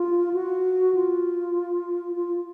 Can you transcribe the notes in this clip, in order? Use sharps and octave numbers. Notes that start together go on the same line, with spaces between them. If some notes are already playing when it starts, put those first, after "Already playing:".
Already playing: F4
F#4
F4
F4